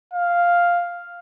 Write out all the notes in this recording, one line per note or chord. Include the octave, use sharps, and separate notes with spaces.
F5